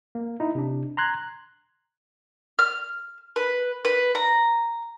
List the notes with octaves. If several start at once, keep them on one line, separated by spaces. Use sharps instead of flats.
A#3
D#4 E4
C3 D4
A#5 C6 F#6 G#6
F6
B4
B4
A#5